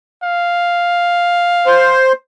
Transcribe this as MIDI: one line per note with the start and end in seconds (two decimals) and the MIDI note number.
0.23 2.05 77
1.67 2.12 72